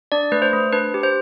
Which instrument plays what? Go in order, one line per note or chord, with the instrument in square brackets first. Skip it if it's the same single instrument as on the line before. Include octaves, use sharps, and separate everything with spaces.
[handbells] D4 D5
A3 B4
C5
A3
D4 B4
G4
C5